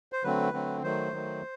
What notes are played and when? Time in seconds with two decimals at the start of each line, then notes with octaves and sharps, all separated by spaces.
0.13 C5
0.24 D3 F#3 A3 C4 B4
0.53 D3 F#3 A3 C4
0.83 D#3 F#3 A3 C5
1.12 D#3 F#3 A3